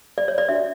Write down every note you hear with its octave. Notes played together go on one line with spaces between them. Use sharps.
D5
C#5
D5
D4 F#4 C#5 E5